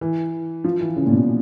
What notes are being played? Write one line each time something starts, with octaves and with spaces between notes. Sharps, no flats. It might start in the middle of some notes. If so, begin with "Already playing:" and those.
E3
F3
E3
C#3
A#2
B2